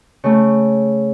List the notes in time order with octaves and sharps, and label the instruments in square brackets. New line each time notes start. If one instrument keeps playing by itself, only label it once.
[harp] C#3 A3